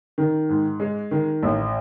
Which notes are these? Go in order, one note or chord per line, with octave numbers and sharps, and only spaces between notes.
D#3
G#2
G#3
D#3
A1